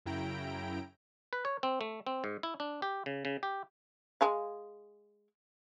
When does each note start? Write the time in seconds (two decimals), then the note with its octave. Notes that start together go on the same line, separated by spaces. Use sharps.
0.06 F#2 C#3 E4 G5 A#5 D7
1.33 B4
1.45 C#5
1.63 C4
1.81 A3
2.07 C4
2.24 G#2
2.43 E4
2.60 D4
2.82 G4
3.06 C#3
3.25 C#3
3.43 G4
4.21 G#3 G#4 F5